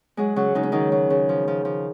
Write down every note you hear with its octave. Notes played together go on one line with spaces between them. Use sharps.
F#3 G#3 G#4
C#3 F#3 F#4
C#3 D#4
C#4
D#3 F#3 D#4
F#3
C#3
F3
F3
F3